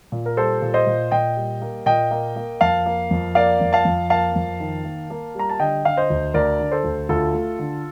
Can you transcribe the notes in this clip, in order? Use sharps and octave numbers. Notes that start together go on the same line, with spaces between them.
A#2
A#4
G3 A4 C5
A#2
C5 D#5
A#2
A#2 D#5 G5
G3
A#3
A#2 D#5 G5
A#3
A#3
F2 F5 A5
A#3
F2
A#3 D5 F5
F2
F5 A5
F2
A#3 F5 A5
F2
D#3
A#3
A#3
G3 A#5
A5
D3 D#5 G5
D3 F5
C5 D#5
D2
D2 A#4 D5
D3
A4 C5
D2
D2 F4 A4
A3
D3